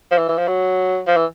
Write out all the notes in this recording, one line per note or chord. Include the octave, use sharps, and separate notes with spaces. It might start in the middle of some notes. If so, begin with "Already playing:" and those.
F3
E3
E3
F3
F#3
F3
E3